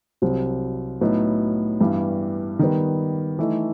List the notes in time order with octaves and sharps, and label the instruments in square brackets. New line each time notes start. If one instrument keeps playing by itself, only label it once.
[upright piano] C2 C3 F#3 C4
A2 F#3 B3 D#4
G2 E3 G3 B3
D#3 G3 B3
E3 A3 D#4